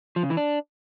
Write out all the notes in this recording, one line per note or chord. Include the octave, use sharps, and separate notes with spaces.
F3
C#3
E3
D4